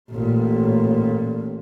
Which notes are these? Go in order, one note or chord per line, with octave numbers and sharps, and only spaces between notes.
A1 A#2